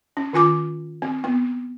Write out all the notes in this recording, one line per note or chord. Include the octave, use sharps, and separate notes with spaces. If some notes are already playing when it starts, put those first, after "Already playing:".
C#4
D#3 F4 G#5 D6
C4
B3